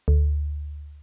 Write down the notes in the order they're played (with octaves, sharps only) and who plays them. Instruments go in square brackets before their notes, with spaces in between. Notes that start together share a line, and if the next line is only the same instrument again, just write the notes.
[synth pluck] D2